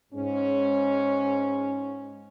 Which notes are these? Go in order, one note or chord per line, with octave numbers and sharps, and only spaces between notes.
G#2 C#4